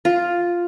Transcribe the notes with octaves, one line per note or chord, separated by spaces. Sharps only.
F4